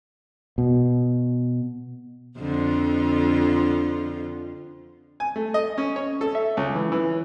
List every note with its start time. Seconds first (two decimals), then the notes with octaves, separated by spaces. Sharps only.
0.58 B2
2.38 F2 D3 F4
5.20 G#5
5.36 A3
5.54 D#5
5.78 C#4
5.96 C#5
6.21 A4
6.35 E5
6.57 C#2
6.75 E3
6.92 E3